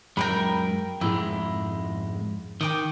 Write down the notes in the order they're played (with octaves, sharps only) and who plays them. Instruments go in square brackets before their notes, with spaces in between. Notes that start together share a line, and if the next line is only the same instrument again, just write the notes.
[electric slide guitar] F#2 G#3 [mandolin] A#4 G5 B5
[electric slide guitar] F2 G#2 G#3 [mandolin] E4
[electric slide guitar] D#3 [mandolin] G5 D6 D#6